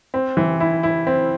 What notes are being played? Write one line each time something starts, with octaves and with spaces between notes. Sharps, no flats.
C4
E3
E4
E4
C4